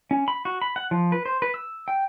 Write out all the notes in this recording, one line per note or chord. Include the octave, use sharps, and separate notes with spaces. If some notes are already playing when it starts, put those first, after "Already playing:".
C#4
B5
F#4
B5
F#5
F3
B4
C5
B4
E6
G5